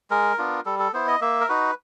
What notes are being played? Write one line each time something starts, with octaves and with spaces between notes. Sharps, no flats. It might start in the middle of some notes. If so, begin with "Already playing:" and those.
G#3 A#4
B3 D4 F4
G3 A4
A4
B3 E4 C5
D#5
A#3 E5
A#4
D#4 F#4 B4